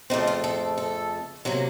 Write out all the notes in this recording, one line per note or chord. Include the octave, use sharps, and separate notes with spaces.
F2 C#3 A3 C4 D#4
F4
A4
A4
C3 F#3 A#3